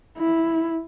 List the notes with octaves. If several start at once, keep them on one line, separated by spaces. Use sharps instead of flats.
E4